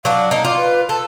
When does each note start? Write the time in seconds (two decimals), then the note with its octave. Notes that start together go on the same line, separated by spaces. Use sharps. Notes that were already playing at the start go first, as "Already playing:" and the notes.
0.05 F#3 D4 F5
0.31 A#3 D#4
0.45 F4 D6
0.57 B4
0.89 A4 A5